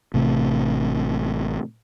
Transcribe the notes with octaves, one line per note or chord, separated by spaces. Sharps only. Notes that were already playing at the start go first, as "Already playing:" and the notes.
A1 C3 A3